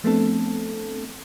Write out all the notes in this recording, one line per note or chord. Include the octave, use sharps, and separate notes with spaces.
F3 A3 B3 C4 D4 A4